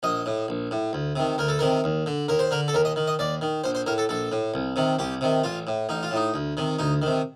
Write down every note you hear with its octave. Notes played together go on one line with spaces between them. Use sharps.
A#1 D#5
A2
A#1
A2
D2
C3 D#3
D2 A#4
A4
C3 D#3 A#4
D#2
D3
D#2 A#4
C5
D3 A#4
A4
D#2 A#4
D#5
D#3
D#5
D#2 D5
D#3
A#1 C5
C5
A2 A#4
A4
A#1 A4
A2
C2
C3 D#3
C2 G4
C3 D#3
A1 F4
A2
A1 D#4
F4
A2 D#4
D2
C3 D#3
D2 D#4
C3 D#3